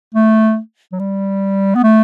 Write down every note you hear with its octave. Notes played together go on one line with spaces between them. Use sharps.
A3
F#3
G3
B3
A3